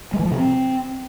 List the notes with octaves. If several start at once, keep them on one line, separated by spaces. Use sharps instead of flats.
G#3
E3
F3
C3
C4